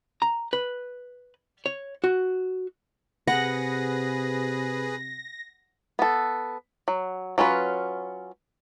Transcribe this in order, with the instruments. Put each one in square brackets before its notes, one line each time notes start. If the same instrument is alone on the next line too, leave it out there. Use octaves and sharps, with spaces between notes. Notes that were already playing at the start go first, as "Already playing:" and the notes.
[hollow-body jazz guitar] A#5
B4
C#5
F#4
[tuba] C3 [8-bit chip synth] G#4 B4 [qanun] F#5 [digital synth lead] A#6
[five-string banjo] B3 A4
F#3
F#3 C#4 F4 B4